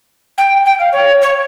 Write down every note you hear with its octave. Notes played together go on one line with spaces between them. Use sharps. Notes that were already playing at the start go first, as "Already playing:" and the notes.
G5
G5
F5
C#5
C#5